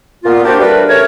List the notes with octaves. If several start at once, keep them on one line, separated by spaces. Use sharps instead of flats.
A#2 B3 F4
A#3 C4 D4 F#4 G4
G3 A3 D4 A#4 B4
C#3 A3 A#4 C#5